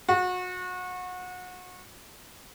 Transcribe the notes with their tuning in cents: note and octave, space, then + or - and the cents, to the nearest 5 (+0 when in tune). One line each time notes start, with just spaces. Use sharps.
F#4 -30